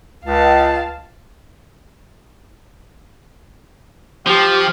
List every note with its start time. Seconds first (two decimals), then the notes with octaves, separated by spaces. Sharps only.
0.24 C#2 F5 A5
4.27 F3 G4